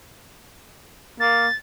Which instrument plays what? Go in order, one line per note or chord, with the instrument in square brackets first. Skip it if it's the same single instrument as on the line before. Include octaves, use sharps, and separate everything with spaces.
[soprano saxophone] A#3 [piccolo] A6